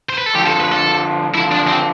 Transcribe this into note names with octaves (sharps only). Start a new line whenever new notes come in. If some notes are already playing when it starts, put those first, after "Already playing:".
C5
B4
A4
D3 F3 G4
A4
B4
A4
D3 F3 E4
D4
C4